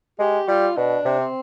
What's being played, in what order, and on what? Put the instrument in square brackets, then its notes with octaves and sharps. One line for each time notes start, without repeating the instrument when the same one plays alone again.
[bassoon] G#3 [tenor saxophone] G4
[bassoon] G3 [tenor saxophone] F4
[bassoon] B2 [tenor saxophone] D4
[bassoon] C3
[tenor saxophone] C4